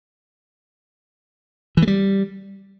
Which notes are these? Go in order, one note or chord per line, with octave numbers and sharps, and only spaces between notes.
E3
A3
G3